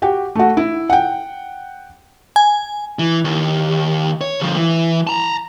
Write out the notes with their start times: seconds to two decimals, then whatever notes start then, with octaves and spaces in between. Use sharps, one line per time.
0.02 F#4 G4 G5
0.35 A3 F#4
0.57 E4
0.90 F#5 G5
2.36 G#5
2.99 E3
3.25 D#2
4.21 C#5
4.40 D2 F3
4.57 E3
5.07 A5 A#5